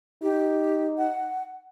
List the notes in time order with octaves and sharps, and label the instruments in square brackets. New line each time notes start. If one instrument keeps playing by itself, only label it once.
[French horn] D#4 [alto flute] G4
[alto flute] F#5